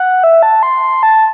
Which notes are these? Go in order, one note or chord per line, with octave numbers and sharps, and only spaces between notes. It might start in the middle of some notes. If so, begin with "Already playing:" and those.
Already playing: F#5
E5
A5
C6
A5